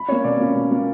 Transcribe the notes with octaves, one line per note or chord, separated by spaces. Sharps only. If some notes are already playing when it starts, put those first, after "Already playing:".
Already playing: B5
A#3 C#4 C#5
B2 D5
A#3 C#4
B2
A#3 C#4